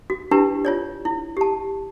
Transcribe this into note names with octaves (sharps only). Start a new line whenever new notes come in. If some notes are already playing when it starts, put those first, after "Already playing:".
F#4
D4 E4 G4 B4 A5
F4 C#5 D5
E4
G4 A5